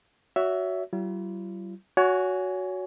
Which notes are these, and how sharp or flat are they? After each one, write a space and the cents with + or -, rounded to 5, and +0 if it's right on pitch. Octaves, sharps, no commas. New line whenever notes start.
F#4 +0 C#5 +25 E5 +0
G3 -45 F4 -45
F#4 -5 C#5 +25 G#5 +0